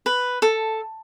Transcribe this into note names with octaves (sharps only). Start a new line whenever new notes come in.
B4
A4